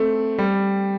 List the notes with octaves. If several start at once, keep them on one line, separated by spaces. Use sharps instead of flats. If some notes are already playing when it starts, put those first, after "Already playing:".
Already playing: A3 C4
G3